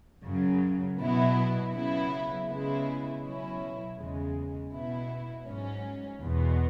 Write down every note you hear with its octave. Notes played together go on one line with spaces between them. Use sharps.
F#2 C#3 F#3
B2 F#3 B3 E4
C#3 F#3 B3 E4
C#3 G#3 B3 E4
B2 F#3 C#4 E4
E2 C#3 G#3
B2 B3 E4
G#2 F#3 C#4
E2 B2 B3